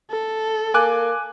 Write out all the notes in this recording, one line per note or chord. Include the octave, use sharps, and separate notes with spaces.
A4
A#3 G#5 D6 F#6